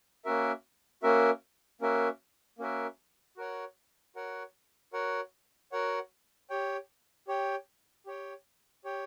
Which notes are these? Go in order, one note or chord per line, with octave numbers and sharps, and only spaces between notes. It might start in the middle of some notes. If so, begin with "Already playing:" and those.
A#3 C#4 F#4 A#4 E5
A#3 C#4 F#4 A#4 E5
A#3 C#4 F#4 A#4 E5
A#3 C#4 F#4 A#4 E5
F#4 A#4 C#5 F#5
F#4 A#4 C#5 F#5
F#4 A#4 C#5 F#5
F#4 A#4 C#5 F#5
G4 C#5 G5
G4 C#5 G5
G4 C#5 G5
G4 C#5 G5